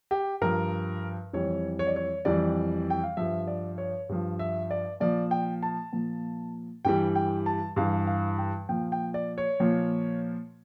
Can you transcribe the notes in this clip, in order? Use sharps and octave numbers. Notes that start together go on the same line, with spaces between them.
G4
G2 F3 A#4
F2 E3 G3 C#5
C#5
D5
C#5
F2 E3 G3 D5
G5
F5
G2 F3 E5
D5
C#5
G2 F3
E5
D5
A#2 F3 D5
G5
A5
A#2 F3
G2 E3 G3 G5
G5
A5
G2 E3 G3 F5
F5
G5
A#2 F3 G5
G5
D5
C#5
A#2 F3